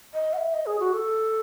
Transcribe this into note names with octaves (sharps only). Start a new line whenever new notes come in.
D#5
F#5
E5
D#5
G#4
F#4
A4